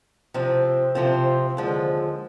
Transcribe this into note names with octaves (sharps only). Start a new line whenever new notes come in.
C3 F3 C4
C3 F3 C4 F4
D#2 D3 F3 G#3